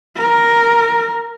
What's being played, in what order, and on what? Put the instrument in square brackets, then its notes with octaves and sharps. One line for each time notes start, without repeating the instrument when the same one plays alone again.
[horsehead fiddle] A#4